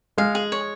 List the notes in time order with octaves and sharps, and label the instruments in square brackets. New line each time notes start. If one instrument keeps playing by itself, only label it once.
[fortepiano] G#3 [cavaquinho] F5
[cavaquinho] G#4
C#5